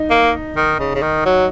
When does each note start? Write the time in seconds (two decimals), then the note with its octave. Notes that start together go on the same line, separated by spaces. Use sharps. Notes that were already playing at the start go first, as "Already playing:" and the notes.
Already playing: D#4
0.10 A#3
0.57 D#3
0.79 C#3
0.95 C#3
1.02 D#3
1.26 F#3